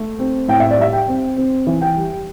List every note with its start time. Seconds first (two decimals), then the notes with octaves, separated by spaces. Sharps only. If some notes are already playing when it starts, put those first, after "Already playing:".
Already playing: A3
0.19 C4
0.48 A2 G5
0.60 E5
0.71 D5
0.78 G3 E5
0.93 G5
1.08 C4
1.37 C4
1.67 E3
1.82 G5
1.96 G3